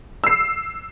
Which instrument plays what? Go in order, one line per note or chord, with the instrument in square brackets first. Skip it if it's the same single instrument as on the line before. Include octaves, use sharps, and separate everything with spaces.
[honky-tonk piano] E6 C7